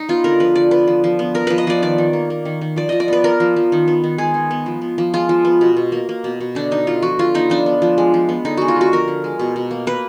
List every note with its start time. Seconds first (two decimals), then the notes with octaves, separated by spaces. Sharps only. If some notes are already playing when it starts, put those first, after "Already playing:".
Already playing: D#4
0.09 B3 F4
0.24 D3 A#4
0.40 F3 B4
0.55 D3 D5
0.71 B3 B4
0.88 F3
1.04 F3
1.19 B3
1.34 B3 A#4
1.47 F3 B4
1.58 D#5
1.67 F3 D5
1.82 D#3 D5
1.98 D#3
2.13 A#3
2.30 A#3
2.45 D#3
2.61 D#3
2.76 F3 D5
2.89 F3 D#5
3.00 D5
3.08 B3 B4
3.24 B3 A#4
3.40 F3
3.56 F3
3.72 D#3
3.88 B3
4.04 D#3
4.18 G#3 G#4
4.34 D#3
4.51 B3
4.66 F3
4.82 B3
4.98 F3
5.14 G#3 F4
5.29 F3
5.45 B3
5.61 B2
5.76 B2
5.92 A#3
6.09 A#3
6.24 B2
6.40 B2
6.55 D3 D4
6.71 B3 D#4
6.87 D3 F4
7.02 F3 F#4
7.19 D3 F4
7.34 B3 D#4
7.50 F3 D4
7.66 B3
7.82 F3
7.98 G#3
8.14 F3
8.29 B3
8.45 D3 D#4
8.57 G#3 F#4
8.68 F4
8.76 D3 F#4
8.92 F3 A#4
9.08 D3
9.24 G#3
9.39 B2
9.56 B2
9.71 A#3
9.87 A#3 B4